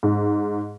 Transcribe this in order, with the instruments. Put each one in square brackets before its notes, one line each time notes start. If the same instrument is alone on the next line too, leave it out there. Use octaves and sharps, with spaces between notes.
[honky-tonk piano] G#2